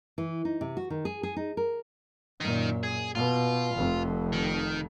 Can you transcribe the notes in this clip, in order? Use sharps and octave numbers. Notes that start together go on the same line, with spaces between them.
E3
D#4
C3
F#4
D#3
G#4
G#4
D#4
A#4
F#2 A#2 D#3 D#4
G#4
B2 F4
F1 F2
D#3